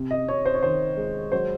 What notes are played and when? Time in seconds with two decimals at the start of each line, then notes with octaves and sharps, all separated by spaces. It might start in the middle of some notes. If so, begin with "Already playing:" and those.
Already playing: C3
0.11 D#5
0.28 C3 C#5
0.45 C5
0.54 C#5
0.63 D#3 C5
0.97 G#3
1.32 F#3 C5